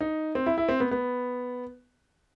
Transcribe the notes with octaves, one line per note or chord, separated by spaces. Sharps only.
D#4
C4
E4
E4
C4
B3
B3